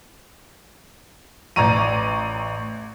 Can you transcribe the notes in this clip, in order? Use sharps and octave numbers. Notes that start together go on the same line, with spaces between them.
A1 D5 A#5 C#6 D#7